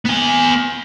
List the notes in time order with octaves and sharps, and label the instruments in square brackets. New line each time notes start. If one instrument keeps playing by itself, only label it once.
[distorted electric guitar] B3 G#5